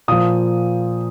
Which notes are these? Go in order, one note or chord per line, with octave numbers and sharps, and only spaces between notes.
A#2 F3 D#6